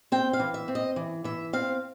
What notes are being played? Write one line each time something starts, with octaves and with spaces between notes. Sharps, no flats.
C4 G5
F5
E3
E5
C4
D#5
E3
E3 E5
C4 F5